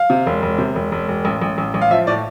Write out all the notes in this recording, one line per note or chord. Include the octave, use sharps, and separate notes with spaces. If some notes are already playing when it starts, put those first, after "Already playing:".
Already playing: F5
C3
E1
E1
C3
E1
E1
E1
A1
A1
A1
A1
F5
F3 E5
A2 D5